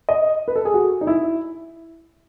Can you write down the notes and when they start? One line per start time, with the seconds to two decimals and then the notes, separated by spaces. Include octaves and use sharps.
0.09 D#5
0.48 B4
0.56 A4
0.65 G#4
0.74 F#4
1.01 D#4
1.07 E4